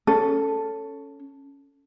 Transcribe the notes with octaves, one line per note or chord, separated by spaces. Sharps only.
C#4 A4